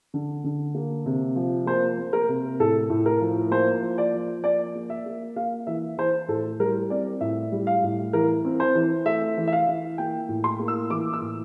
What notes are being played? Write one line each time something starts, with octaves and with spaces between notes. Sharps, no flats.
D3
D3
A#3
C3
F3
A#3 C5
A#3
A#4
C3
A2 A4
A2
A#4
F3
A#3 C5
F3
D5
F3
A#3 D5
A#3
E5
A#3
A#3 F5
E3 E5
E3 C5
A2 A4
G3 A#4
C4 D5
A2 E5
G3
F5
A2
E3 A#4
C4
C5
E3
A3 E5
E3
E5
F5
E3
A#3 G5
A2
C6
A#3
E6
E3 D6
E6
A2